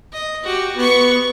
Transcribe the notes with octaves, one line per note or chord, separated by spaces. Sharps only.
D#5
F#4 G4
B3 C#6